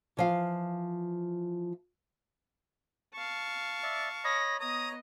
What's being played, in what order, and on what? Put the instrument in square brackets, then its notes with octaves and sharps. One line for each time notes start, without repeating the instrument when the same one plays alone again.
[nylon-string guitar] E3 F3 F5
[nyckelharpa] F5 A5 [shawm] C#6
[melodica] D5 E5
[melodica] C#5 D#5 B5 [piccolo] A#6
[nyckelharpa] B3 D#5 [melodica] C#5 [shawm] A#5 [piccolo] D#6